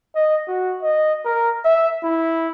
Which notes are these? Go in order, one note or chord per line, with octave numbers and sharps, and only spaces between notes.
D#5
F#4
D#5
A#4
E5
E4